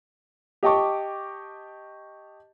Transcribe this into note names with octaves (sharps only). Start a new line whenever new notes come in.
G4 D#5 G5 A5 C#6 D6